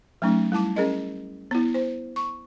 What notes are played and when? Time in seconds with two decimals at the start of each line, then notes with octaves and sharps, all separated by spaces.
0.22 F#3 A3 C#4 D#4
0.52 G3 E4 A5 D6
0.76 C#4 G#4 A#4 D#5
1.51 B3 E4
1.74 C5
2.16 C#6